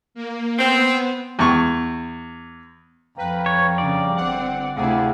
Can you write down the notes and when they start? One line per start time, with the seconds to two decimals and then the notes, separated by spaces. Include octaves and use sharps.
0.15 A#3
0.59 B3 C4
1.39 E2 C#6
3.18 F2 B4 F5 G5 A#5
3.46 C#5
3.78 G2 C#3 D5
4.16 G1 C4 F#5
4.76 D2 C3 E4 G#4 F5 F#5